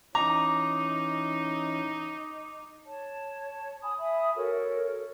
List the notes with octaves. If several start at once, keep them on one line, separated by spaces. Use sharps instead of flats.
E3 C#4 D#4 A#5 D6
C#5 A5
G#5 B5 D#6
E5 G#5 B5 D#6
F#4 A4 A#4 C#5